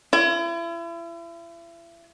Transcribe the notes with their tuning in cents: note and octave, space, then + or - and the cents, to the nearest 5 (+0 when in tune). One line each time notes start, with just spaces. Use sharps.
E4 +40